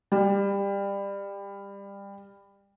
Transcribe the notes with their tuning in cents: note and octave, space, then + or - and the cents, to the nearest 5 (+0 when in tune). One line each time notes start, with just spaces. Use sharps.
G3 +20